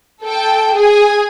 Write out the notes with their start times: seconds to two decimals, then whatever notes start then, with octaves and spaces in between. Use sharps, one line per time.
0.24 A4 G5
0.75 G#4 G#5